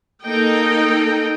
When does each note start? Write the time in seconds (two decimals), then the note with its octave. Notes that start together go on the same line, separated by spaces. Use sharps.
0.23 A#3 D#4 A4 D#5 G5